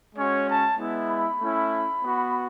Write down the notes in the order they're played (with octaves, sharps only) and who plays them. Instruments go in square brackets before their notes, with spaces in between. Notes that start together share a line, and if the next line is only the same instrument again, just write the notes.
[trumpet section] G#3 C#4 F#4 C#5
A5
G#3 B3 E4
B5
A3 C#4 E4
B3 F#4